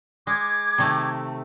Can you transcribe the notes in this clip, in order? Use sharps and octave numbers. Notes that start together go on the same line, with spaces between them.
G#3 D6 G#6
C3 D#3 A3